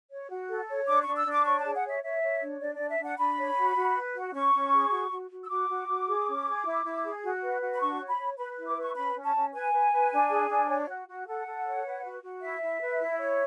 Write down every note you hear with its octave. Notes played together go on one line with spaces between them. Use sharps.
C#5
F#4
A4
C#5
D4 D6
C#6
D4
E6
D4 D6
C#5 C#6
G#4 A5
F#5
C#5 E5
C#5 E5
C#5
D4
D4 D5
D4 D5
E5
D4
F#5
D4 B5
C#5
F#4
F#4
B4
F#4
C#4 C#6
C#4
G#4
F#4
F#4
F#4
E6
F#4 D6
F#4
F#4
G#4
C#4
G#4
E4
E4
G#4
F#4
B4
F#4
B5
D4 C#6
C#5
B5
C#5
B4 B5
E4
D6
B4 C#6
C#4 B5
C#4
A5
C#4
B4 G#5
B4
B4
D4
G#4
D4
C#5
F#4
F#4
A4 F#5
A4
C#5
B4
F#4
F#4
E4 E5
E4
B4
E4
C#5